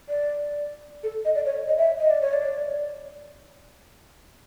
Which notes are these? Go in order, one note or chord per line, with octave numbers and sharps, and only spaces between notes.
D5
A4
D#5
D5
C#5
D#5
E5
D#5
D5
C#5
D5